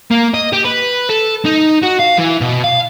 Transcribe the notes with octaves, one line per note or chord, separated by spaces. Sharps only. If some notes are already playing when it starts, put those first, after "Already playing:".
A#3
D#5
G4
B4
A4
D#4
F#4
F5
E3
B2
F5